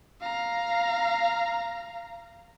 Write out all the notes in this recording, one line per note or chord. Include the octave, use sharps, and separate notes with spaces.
F5 A#5